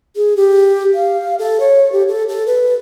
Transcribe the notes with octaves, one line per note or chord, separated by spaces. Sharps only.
G#4
G4
F5
A4
C#5
G4
A4
A4
B4